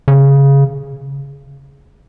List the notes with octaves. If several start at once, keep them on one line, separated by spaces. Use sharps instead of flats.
C#3